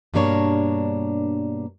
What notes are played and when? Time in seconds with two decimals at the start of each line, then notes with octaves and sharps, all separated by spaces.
0.14 G2 B2 G3 A#3 D4 C#5